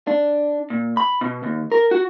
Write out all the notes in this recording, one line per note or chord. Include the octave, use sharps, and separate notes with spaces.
D4
A#2
B5
B2
D#2
A#4
F#4